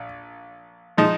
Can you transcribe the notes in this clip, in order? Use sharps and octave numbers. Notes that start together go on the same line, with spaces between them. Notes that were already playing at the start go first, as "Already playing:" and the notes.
Already playing: A#1
F3 G#3 D#4